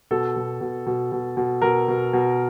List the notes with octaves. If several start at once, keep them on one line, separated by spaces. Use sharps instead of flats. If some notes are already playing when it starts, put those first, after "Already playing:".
B2 A4
B2
B2
B2
B2
B2
B2 A#4
B2
B2